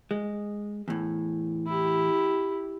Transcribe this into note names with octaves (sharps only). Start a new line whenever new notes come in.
G#3
E2 A2
E4 G4